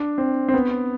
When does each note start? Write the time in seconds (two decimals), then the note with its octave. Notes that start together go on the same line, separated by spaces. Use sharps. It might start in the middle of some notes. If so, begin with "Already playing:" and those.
Already playing: D4
0.18 C4
0.48 C4
0.54 B3